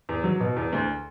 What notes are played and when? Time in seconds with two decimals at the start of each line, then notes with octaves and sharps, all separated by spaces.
0.09 E2
0.24 F#3
0.40 B2
0.56 E2
0.73 D2